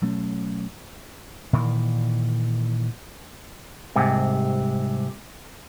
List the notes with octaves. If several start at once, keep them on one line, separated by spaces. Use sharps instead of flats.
B2 F#3 A3 C#4
A#2 D#3 E3
C2 G#2 C3